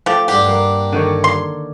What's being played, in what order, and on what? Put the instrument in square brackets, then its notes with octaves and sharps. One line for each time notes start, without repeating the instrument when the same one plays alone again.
[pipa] F3 G4 [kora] A3
[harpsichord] G2 D4 F#5 [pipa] G4
[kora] A#3
D3 D#3 C#5
[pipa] C6